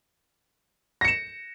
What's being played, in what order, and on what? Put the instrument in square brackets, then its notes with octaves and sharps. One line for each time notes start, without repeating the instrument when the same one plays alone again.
[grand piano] A#6
C#7
E7